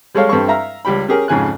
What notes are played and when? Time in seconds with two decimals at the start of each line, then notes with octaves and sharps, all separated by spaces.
0.15 G3 G#3 A4 C#5 F5
0.29 G2 C4 A4 C#6
0.48 E5 F5 A#5
0.85 C#2 G3 G4 G5 B5
1.08 C#4 G4 G#4 A#4
1.28 F2 G#2 C#3 G#5 F#6